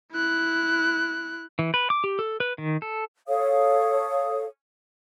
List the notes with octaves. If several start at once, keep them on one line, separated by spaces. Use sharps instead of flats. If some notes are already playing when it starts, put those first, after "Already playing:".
E4 F#6
E3
B4
D6
G4
A4
B4
D#3
A4
A4 C#5 F5 D#6